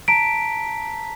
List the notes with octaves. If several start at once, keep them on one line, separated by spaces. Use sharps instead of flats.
A5 A#5 B6 D7